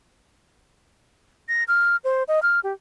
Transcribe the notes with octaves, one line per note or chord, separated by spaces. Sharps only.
A#6
F6
C5
D#5
F6
G4